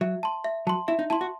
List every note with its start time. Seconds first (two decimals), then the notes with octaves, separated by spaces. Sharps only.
0.01 F#3 E5
0.23 A5 C6
0.44 E5
0.67 F#3 A5 C6
0.88 E4 E5
0.99 D#4
1.10 E4 A5 C6
1.21 F#4